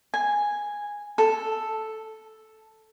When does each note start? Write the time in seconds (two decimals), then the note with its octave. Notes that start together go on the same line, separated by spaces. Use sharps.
0.14 G#5
1.18 A4